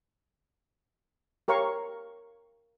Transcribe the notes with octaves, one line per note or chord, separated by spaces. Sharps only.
G4 A#4 C#5 F5 C#6